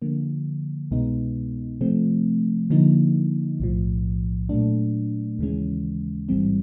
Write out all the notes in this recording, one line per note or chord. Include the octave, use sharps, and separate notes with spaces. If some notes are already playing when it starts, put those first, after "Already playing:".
D3 F3 A#3
C2 B2 G#3 B3 D#4
C3 F3 A3 C4
D3 F3 A#3 D#4
B1 A2 F3
A#2 F#3 A3 D4
D#2 C#3 E3 G#3 C#4
A1 G#2 E3 G3 C4